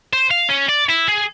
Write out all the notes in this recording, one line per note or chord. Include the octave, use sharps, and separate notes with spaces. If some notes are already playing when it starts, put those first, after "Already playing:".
C5
F5
C#4
D5
E4
G#4